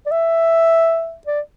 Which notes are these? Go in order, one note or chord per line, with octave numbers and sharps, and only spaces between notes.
D5
E5
D5